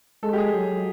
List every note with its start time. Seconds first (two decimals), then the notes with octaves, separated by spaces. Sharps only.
0.23 G#3 A4
0.33 G4
0.38 G#4
0.53 F#3